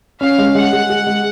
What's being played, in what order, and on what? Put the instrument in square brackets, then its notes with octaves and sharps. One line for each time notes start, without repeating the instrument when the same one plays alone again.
[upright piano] C#4 [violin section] F5
[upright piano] G#3
[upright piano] G#3 [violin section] F#5
[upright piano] G#4
G#4
G#3